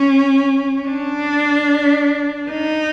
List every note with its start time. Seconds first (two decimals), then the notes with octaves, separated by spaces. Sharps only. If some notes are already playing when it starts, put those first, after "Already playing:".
Already playing: C#4
0.88 D4
2.50 D#4